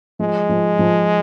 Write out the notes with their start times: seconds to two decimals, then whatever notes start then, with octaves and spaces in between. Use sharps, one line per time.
0.20 F3 G#3
0.49 F3
0.79 F3